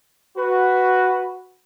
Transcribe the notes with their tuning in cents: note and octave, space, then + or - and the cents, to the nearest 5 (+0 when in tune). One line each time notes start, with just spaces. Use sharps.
F#4 +0 B4 +0